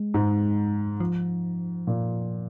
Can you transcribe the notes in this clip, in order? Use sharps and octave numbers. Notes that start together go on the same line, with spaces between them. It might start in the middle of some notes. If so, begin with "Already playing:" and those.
Already playing: G#3
G#2
F3
A#2